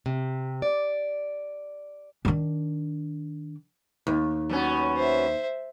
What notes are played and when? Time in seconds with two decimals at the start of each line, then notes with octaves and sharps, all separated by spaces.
0.06 C3
0.62 D5
2.25 D#3 D4
4.07 D#2
4.50 F#3 B3 C#4
4.96 C5 E5